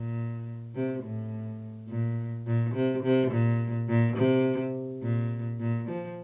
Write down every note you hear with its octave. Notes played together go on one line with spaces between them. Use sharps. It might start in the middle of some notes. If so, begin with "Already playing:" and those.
Already playing: A#2
C3
A2
A#2
A#2
C3
C3
A#2
A#2
C3
A#2
A#2
F3